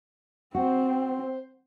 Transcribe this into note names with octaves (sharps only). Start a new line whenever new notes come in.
C4 F#4 C5